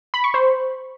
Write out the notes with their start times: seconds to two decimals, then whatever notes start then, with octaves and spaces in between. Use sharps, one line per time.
0.14 B5
0.24 C#6
0.34 C5